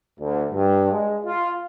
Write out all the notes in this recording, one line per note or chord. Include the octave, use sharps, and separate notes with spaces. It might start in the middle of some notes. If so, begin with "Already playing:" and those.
D2
G2
G#3
F4